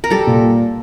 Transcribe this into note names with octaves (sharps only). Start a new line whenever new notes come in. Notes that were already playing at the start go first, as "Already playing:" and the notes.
A#4
G3 G4 A4
A#2